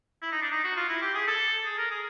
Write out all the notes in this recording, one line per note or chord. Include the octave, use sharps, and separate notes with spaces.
E4
D#4
D4
D#4
F#4
F4
E4
G4
G#4
A4
G#4
A#4
G#4